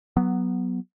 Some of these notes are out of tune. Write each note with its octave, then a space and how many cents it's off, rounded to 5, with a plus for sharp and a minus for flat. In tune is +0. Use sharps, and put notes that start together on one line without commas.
F#3 +5 B3 -10